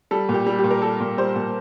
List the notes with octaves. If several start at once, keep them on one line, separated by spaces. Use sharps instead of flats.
G3 A4
A#2
G4
G3
G4
A#2
A#4
G3 A4
A#2
G3 C5
A#2